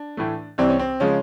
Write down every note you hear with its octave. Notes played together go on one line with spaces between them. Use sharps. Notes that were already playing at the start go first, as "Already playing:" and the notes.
Already playing: D4
A2 E3 A3
C2 C3 E3 G3 C4
C#4
C4
C#3 F3 G#3 C#4